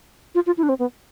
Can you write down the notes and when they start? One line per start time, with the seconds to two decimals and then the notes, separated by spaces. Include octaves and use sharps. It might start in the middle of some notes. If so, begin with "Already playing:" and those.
0.35 F4
0.46 F4
0.57 E4
0.63 D4
0.69 C4
0.79 B3